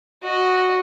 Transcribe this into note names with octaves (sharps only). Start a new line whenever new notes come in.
F#4 D#5